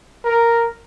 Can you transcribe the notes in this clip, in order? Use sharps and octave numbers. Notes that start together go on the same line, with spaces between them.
A#4